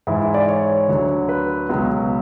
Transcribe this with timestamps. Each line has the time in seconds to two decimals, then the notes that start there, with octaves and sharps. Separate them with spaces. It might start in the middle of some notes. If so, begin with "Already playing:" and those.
0.07 G#2 E3 E4
0.20 E4
0.34 D5
0.48 C#5
0.88 D2 D3 F#3
1.29 B4
1.69 C#2 B2 F#3